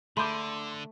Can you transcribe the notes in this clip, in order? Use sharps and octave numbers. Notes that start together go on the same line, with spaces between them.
D3 A3 B5 C6 D6 G6